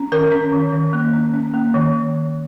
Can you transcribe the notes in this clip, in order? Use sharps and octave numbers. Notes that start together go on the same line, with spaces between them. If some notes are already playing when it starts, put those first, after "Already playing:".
Already playing: C#4
D#3 A#4
C#4
D#3
D#3
A#3
C#4
C#4
A#3
D#3